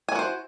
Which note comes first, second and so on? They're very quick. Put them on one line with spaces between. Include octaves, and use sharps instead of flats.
G#5 E4 F#4 C5